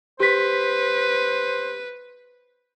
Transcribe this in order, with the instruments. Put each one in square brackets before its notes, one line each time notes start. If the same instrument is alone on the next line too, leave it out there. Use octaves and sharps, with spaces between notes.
[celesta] G4 B6 [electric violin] B4 [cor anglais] C5